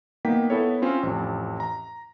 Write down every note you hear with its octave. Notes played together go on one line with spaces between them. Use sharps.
A#3 B3 D#4 G5 B6
B3 E4 A4 C#5
C4 C#4 F4
A1 F2
A#5